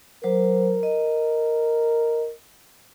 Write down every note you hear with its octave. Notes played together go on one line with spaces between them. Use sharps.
F#3 A#4 C5
D#5